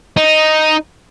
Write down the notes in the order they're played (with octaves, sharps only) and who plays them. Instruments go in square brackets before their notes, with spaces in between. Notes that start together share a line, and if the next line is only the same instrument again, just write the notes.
[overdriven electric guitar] D#4